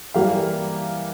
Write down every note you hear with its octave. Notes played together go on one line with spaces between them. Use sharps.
E3 G3 A#3 F5